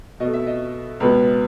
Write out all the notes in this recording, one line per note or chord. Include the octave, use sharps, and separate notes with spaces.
B2 A3 D#5
E5
D#5
C#2 B2 G#3 B3 B4